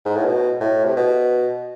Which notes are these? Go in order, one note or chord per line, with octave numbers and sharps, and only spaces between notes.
G#2
A2
B2
A2
C3
B2